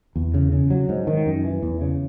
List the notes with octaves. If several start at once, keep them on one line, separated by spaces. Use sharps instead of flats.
E2
C#3
C#3
F#3
G#2
D#3
F#2
E3
E2
C#3